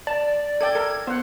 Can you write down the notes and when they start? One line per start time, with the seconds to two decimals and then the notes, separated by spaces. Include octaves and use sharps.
0.07 D5 A5
0.61 A4 D5 G5 G#6
0.75 A4 A#4
1.07 B3 C5 F#5